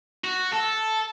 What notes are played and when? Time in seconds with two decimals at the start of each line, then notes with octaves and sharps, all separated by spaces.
0.24 F#4
0.54 A4